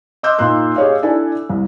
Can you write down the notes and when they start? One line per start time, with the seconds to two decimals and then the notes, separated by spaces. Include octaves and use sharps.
0.23 D#5 C6 D6 E6 F#6 G6
0.38 A#2 A#3 D#4 C6 F#6
0.76 G4 G#4 C#5 D#5 F5
1.02 D4 E4 A4 D5 G#5
1.49 C2